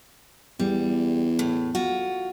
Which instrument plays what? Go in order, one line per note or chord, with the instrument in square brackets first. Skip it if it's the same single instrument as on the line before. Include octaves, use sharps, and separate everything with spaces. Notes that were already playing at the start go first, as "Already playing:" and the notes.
[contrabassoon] E2 [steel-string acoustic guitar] G3
[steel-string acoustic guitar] A2
F4 F#4